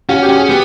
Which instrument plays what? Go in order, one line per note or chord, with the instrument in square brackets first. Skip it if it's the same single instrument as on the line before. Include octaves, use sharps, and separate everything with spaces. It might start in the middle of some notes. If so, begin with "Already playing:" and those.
[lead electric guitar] C#4 [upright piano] F#4
[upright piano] G4
[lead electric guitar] C#4
[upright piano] G#4
[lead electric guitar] B3 [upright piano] G4